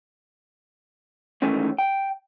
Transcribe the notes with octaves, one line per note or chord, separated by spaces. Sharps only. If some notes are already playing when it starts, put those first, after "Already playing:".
G#2 D#3 E3 A3 C#4 D#4
G5